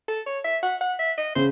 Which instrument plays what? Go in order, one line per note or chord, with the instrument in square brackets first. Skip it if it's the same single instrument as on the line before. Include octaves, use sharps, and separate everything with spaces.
[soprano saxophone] A4
C#5
E5
F#5
F#5
E5
D#5
[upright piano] C#3 [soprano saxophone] C5